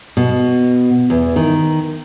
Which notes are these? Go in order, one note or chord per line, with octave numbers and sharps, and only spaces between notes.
B2
E2
D#3